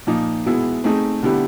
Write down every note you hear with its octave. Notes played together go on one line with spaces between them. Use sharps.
A#2 F3 A#3 D#4
B2 G#3 B3 E4 G#4
A3 C4 D#4 G#4
D3 G3 B3 E4 G4